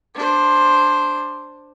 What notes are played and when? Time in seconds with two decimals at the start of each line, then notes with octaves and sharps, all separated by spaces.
0.14 D4 C5